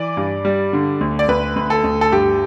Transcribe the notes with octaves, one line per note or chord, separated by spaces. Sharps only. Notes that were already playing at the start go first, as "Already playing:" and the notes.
Already playing: E3 D5
G2
G3
D3
D2
D5
D2 B4
D2
A4
D2
A4
G2 G4